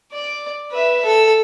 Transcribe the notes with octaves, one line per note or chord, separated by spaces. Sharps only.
D5
B4 E5
A4